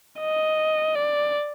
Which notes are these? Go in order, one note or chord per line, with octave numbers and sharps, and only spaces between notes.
D#5
D5